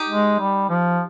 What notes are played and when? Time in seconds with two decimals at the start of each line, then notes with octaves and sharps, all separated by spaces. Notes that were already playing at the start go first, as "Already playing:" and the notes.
Already playing: D#4 G4
0.09 G#3
0.39 G3
0.69 F3